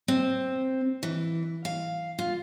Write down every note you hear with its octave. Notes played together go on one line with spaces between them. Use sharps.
C4
E3
F5
F4